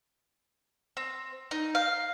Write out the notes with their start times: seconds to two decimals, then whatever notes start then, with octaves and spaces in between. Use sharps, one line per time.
0.97 C4
1.51 D#4
1.75 F5